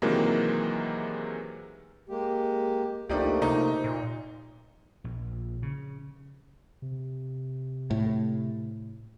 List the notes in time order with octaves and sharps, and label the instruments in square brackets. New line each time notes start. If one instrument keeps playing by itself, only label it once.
[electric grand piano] C3 D#3 E3 F#3 G#3 A#3
[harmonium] G#3 A#3 G4
[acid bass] C#2 [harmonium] F3 A3 A#3 [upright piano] D4 D#4 G4
[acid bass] C3 [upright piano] D#4
[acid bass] A#2
[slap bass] A#1
C#3
[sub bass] C3
[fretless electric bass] A2